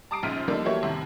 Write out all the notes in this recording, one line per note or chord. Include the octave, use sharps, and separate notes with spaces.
A5 A#5 D6 D#6 C7 D7
A#1 G#2 C#3 F6 B6 D#7
D3 F3 G3 A#3 D4 D#4
E3 F#3 A3 A#3 G4 C#5
D#2 A2 C3